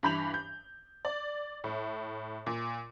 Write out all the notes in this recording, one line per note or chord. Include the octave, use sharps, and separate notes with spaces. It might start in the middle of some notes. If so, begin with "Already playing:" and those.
G2 E3 B5 G6 F7 F#7
G6
D5
A2
A#2